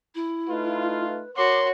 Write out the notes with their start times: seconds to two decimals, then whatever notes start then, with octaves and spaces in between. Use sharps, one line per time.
0.15 E4
0.49 A3 D#4 F4 B4
1.36 F#4 A#4 C#5 C6 D6